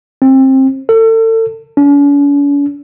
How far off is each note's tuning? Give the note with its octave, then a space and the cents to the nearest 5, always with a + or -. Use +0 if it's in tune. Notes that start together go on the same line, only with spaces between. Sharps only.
C4 +25
A4 +35
C#4 +45